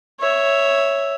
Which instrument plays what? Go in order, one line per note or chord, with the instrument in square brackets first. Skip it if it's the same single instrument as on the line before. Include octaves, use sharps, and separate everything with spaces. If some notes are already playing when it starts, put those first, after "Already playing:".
[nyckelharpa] C#5 E5